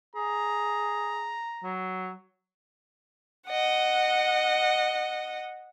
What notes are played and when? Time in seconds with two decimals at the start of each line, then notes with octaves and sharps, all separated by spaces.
0.15 G#4 A#5
1.64 F#3
3.48 D#5 F#5